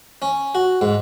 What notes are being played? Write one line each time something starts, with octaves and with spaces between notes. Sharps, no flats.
C#4
F#4
G#2